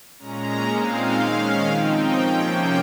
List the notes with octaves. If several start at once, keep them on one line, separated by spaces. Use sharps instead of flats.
A#2 G#3 C#4 A#5
A#2 G#3 C4 D#4 F5
D#3 G#3 C#4
F3 C4 D#4 G5
C3 F3 A#3 C#4